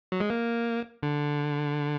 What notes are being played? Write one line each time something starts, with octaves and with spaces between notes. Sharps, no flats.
F#3
G#3
A#3
D3